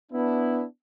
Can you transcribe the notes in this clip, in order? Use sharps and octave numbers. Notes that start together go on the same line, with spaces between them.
B3 D4 E4